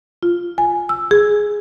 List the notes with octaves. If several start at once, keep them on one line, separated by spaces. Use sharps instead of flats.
F4
G#5
E6
G#4